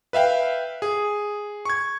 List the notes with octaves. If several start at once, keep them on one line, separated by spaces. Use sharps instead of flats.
B4 E5 F5 G5
G#4
C#6 G#6